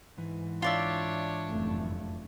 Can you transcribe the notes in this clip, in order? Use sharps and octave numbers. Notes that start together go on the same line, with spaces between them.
G#2 E3
D4 F4 C#5 D5 E5
F1 F#2 A3